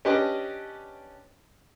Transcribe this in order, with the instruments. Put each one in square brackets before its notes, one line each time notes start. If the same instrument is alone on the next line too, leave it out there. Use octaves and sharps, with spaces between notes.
[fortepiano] C#4 D4 G4 B4 D#5 A5